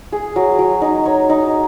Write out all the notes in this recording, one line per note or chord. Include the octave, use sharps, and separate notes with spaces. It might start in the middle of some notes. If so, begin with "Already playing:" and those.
G#4
F#3
F#3
D#4
C#5
D#4